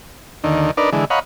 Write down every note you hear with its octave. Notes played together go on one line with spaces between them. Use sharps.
D#2 D3 D#3
D4 D#4 A#4 B4 D5
D3 E3 G#3
C#5 D#5 F5 F#5 A#5 B5